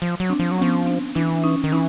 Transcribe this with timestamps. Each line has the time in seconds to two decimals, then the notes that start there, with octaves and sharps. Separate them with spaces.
0.02 F3
0.20 F#3
0.30 C4 D4
0.39 F3
0.51 F#3
0.58 F3 B3 C#4
0.86 C4 D4
1.15 E3 D4 E4
1.36 D4
1.44 C#4 D#4
1.64 D#3
1.72 E3 C#4 D#4